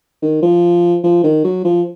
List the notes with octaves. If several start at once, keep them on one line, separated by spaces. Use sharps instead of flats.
D#3
F3
F3
D#3
F#3
F3